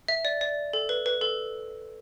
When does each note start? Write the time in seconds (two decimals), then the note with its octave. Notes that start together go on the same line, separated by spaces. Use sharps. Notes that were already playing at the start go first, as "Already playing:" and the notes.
0.08 E5
0.25 D5
0.41 D5
0.73 A4
0.89 B4
1.06 B4
1.21 A4